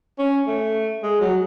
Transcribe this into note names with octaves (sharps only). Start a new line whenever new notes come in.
C#4
A3
G#3
F#3